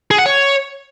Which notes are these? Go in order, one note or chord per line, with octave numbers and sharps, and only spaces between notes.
G#4
F#5
C#5